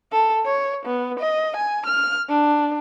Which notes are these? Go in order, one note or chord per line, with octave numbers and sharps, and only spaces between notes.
A4
C#5
B3
D#5
G#5
F6
D4